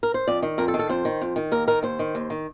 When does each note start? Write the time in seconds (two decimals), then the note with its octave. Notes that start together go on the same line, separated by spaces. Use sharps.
0.03 A#4
0.14 C5
0.28 F2 D5
0.43 D#3
0.58 F2 A#4
0.68 A4
0.74 D#3
0.79 A4
0.89 F2 C5
1.05 D#3
1.21 F2
1.36 D#3
1.52 D#2 A#4
1.67 D#3 A#4
1.83 D#2 C5
1.99 D#3
2.15 D#2
2.30 D#3